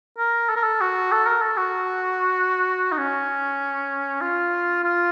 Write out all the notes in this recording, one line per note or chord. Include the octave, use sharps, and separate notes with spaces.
A#4
A4
A#4
A4
F#4
A4
A#4
A4
F#4
D#4
C#4
F4
F4